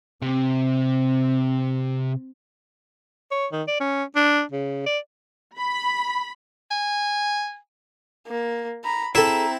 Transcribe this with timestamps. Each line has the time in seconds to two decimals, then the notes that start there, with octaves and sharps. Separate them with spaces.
0.22 C3 C4
3.31 C#5
3.52 D#3
3.68 D5
3.80 C#4
4.16 D4
4.52 C#3
4.86 D5
5.57 B5
6.71 G#5
8.27 A#3
8.84 A#5 B5
9.15 C4 E4 G#4 A4 E5 A#5